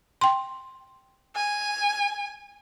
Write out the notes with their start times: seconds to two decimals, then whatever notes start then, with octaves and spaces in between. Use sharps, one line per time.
0.21 G5 C6
1.36 G#5